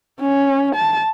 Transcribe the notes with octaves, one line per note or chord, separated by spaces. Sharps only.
C#4
A5